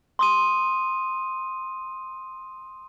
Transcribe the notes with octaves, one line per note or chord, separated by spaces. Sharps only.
C6 D#6 D#7